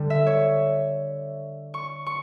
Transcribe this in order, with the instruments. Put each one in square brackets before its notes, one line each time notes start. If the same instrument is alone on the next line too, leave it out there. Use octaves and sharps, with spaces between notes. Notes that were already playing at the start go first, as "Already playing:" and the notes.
Already playing: [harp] D3 G3
E5
C#5
C#6
C#6